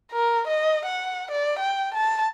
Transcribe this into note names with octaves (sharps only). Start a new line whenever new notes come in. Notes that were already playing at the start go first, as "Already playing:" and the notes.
A#4
D#5
F#5
D5
G5
A5